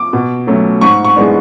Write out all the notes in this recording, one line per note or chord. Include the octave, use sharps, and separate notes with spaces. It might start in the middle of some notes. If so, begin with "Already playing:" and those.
Already playing: D6
B2
F#3 A3 C#4
G#2 C#6
C#6
E3 G#3 B3 D4